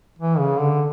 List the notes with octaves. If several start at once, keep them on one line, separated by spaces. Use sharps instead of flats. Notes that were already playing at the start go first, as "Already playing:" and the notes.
E3
C#3
D3